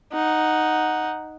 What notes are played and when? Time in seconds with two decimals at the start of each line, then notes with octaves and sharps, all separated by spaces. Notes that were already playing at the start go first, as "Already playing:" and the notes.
0.13 D#4 F#5